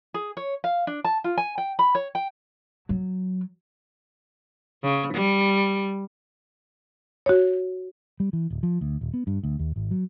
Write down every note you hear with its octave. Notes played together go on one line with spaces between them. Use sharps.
G#4
C#5
F5
D4
A5
F4
G#5
G5
B5
C#5
G5
F#3
C#3
G3
F#4 C#5
G3
E3
D1
F3
D2
D#1
B3
G2
D2
D#2
G#1
F#3